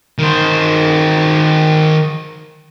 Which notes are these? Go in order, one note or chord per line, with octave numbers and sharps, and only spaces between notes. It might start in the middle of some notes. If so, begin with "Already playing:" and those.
D#3 C5